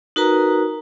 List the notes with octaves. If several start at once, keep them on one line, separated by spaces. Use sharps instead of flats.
D#4 F#4 A#4 B4 A#5